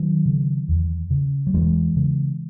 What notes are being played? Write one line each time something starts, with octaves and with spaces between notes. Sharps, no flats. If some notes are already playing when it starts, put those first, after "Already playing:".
Already playing: D#3 F#3
C#3
E2
C#3
F#3
E2 E3 G#3
C#3